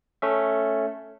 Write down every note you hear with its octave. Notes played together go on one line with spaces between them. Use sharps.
A3 C#4 E5